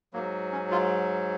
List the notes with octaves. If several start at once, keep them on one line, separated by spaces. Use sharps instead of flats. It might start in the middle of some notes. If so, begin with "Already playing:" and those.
G#2 F#3 A#3
C#4
F4